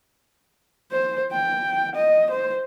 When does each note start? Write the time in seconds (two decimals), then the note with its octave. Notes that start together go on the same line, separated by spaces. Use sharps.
0.92 C5
1.32 G5
1.95 D#5
2.31 C5